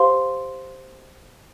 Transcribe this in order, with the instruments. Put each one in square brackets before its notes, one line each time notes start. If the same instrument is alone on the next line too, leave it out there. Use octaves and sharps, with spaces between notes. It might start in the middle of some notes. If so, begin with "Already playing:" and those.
Already playing: [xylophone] G4 C5 F5 C6